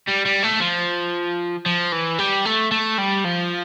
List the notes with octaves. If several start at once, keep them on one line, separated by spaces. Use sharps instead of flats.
G3
G3
A3
F3
F3
E3
G3
A3
A3
G3
F3